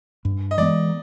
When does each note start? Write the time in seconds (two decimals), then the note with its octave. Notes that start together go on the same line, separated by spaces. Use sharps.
0.25 G2
0.51 D#5
0.57 E3 G#3 B3 D5